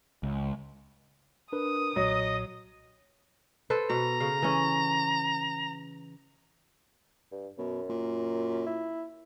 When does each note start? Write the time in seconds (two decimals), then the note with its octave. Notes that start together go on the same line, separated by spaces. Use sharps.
0.23 C#2
1.53 D4 A#4 B4 D#6
1.96 B1 A#2 F#3 D#5
3.70 A4 B4 C5
3.90 B2 A#5
4.20 C#3 F5
4.42 E3 C#4
7.32 G2
7.58 F#2 B2
7.89 A#2
8.66 E4